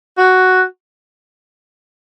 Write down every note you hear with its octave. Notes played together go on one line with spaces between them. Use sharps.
F#4